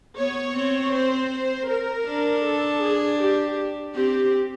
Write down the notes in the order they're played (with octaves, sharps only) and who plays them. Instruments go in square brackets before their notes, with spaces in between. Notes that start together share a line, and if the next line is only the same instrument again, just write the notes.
[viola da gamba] B3 [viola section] C#5
[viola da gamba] C4
[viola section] C5
A#4
[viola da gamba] D4
[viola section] A4
G#4
G4
[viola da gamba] C4 [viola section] G4